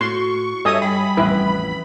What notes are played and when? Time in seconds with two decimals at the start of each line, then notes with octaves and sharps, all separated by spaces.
0.01 A2 F#4 C6 C#6
0.65 G2 A4 C#5 D#5 E5 G#5 D#6
0.82 G3 B5
1.17 A1 F2 E4 B4